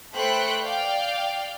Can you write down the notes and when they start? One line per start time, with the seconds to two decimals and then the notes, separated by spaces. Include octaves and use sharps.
0.14 A3 B4 C5 G5 F#6 C#7
0.62 D5 F5 G5